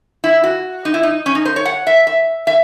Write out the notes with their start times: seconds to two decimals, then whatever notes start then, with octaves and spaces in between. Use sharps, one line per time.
0.24 E4
0.44 F#4
0.85 D#4
0.94 E4
1.03 D#4
1.26 C#4
1.35 D#4
1.45 C5
1.56 C#5
1.65 F#5
1.87 E5
2.07 E5
2.47 E5